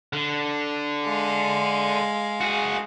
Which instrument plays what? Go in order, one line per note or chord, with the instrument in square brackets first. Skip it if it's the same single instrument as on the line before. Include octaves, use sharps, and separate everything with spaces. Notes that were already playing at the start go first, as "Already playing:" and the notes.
[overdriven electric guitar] D3
[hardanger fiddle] G#3 F5
[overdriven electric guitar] F#4 G#4